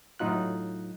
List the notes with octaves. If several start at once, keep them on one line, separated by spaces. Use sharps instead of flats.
A2 F#3 D#4 F4 F#6